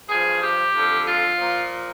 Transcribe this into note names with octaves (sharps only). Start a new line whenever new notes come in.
G2 F3 G#4
G4
F2 D3 F3
F4
A#2 F3